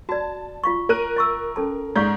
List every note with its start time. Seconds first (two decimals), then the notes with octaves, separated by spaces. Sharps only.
0.09 F#4 D5 A5
0.64 F4 F5 C#6
0.89 A#4 F#6 D#7
1.16 E5 C#6 E6
1.56 C#4 A4 A5
1.96 G#2 D5 F5 C#6 G6